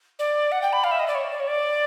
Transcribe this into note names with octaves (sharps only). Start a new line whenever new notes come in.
D5
F#5
G5
B5
F5
E5
D#5
D5
C#5
D5
C#5
D5